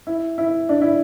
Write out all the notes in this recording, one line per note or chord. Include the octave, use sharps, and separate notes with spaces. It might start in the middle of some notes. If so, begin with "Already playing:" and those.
E4
E4
D4
E4